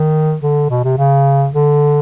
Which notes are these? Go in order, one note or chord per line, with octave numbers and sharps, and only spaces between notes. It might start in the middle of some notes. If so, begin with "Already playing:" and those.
Already playing: D#3
D3
B2
C3
C#3
D3